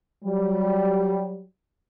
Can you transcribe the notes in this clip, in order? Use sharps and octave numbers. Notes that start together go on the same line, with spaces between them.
F#3 G3